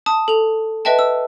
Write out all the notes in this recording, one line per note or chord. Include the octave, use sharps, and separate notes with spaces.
A5 D#6
A4 F7
B4 D#5 E5 G5 A5
E6